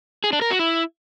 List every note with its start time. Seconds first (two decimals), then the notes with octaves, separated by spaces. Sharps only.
0.24 G#4
0.33 D4
0.42 A#4
0.50 F#4
0.59 E4